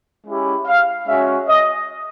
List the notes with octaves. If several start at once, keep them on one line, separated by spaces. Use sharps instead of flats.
G#3 C#4 E4 G4
F5
G#3 C#4 F#4 E5
D#5